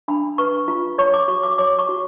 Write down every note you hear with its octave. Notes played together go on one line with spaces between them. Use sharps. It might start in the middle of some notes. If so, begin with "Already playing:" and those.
D4 B5
B4 C#6
F4
C#5 C#6
D6
F#4 C#6
D6
C#5 D6
C#6
F#4